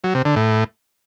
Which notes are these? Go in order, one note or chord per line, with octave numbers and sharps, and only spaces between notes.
F#3
C3
D3
A2